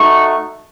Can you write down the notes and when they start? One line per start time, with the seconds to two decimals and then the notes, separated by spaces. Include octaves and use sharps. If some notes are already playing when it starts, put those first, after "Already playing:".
Already playing: A3 D#4 F#4 C#6